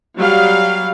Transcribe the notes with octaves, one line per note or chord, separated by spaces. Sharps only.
F#3 G3 F5